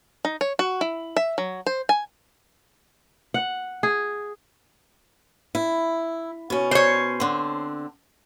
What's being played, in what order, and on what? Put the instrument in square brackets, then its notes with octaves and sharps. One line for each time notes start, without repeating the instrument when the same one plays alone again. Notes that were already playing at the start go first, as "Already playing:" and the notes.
[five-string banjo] D#4
C#5
F#4
E4
E5
F#3
C5
G#5
[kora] F#5
G#4
[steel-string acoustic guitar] E4
B2 C#4
[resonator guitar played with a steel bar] C5 C#5
[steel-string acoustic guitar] D3 C4